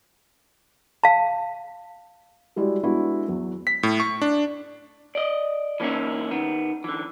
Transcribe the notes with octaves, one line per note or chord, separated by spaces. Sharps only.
F5 A5
G3 G#3 E4 F#4 G4 D5
G#3 B3 D4 E4 F#4
E2 F#3
B6
A2
C#6
D4
D5 D#5
E3 A#3 C#4 D#4 E4
D#3 B3
D3 E3